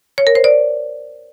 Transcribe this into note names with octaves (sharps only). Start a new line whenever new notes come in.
C#5
A#4
C5
D5